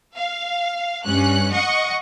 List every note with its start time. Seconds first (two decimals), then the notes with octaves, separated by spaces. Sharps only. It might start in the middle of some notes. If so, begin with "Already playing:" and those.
0.15 F5
1.05 G2 C#4 F#6
1.52 D#5 F#5 C#6